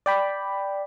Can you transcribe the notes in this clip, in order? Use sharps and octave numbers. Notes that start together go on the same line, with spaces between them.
D5 G5 B5